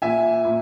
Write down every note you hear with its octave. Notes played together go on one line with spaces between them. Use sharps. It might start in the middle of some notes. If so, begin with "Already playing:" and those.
A#2 E5 G#5
A#2